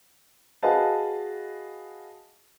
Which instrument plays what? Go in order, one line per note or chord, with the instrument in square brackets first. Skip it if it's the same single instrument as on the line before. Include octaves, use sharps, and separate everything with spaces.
[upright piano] F#4 G#4 B4 D#5 F5 A5